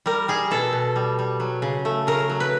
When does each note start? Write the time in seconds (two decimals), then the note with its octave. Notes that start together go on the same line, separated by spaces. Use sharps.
0.06 G3 A#4
0.28 G3 G#4
0.51 B2 A4
0.73 B2
0.96 G3
1.19 G3
1.40 F#3
1.62 C#3
1.85 A3
2.07 C#3 A#4
2.29 F#3
2.40 B4